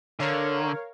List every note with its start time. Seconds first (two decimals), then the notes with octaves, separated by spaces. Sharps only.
0.20 D3 A#4 C#5 F5